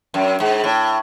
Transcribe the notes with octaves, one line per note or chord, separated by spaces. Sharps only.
F#2
G#2
A2